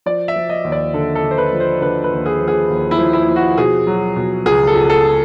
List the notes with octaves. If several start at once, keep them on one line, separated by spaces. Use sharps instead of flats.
F3 D5
E5
F3
D#5
D#2
D5
D3 A4
A4
D3
C5
B4
F3
C5
D3 B4
B4
D#2
G#4
F3
G#4
D#2
E4
F3
E4
F3
F#4
B2 G#4
F#3
B2
C#2 G#4
A4
C#2
A4